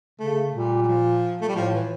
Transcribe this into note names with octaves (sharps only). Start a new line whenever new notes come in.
C#3 A3
A#2 G3
G3
F3
A3
G3
A2 F3
E3